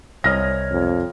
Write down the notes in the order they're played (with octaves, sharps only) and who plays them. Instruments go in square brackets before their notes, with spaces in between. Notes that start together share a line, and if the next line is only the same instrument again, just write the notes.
[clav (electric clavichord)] C2 D#5 G#5 [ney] C#5 [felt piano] F6 A#6
[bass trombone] F2